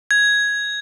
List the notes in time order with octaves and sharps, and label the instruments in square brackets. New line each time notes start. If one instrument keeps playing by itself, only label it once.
[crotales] G#6